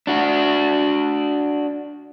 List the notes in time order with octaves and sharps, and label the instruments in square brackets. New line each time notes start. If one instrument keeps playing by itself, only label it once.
[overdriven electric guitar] D4 F#4